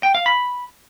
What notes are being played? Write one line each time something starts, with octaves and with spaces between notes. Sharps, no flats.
G5
F5
B5